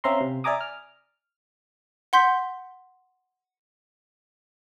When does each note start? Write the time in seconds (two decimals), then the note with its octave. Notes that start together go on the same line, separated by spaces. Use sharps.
0.04 C4 C#4 E5 F5 A#5 C6
0.20 C3
0.44 D5 E5 G#5 A#5 D6 D#6
0.61 F6
2.13 F#5 C6 G6 B6